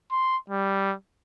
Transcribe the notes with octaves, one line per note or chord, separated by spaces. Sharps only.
C6
G3